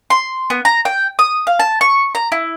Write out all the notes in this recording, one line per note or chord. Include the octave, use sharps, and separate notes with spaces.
C6
B3
A#5
G5
D#6
F5
A5
C#6
A#5
E4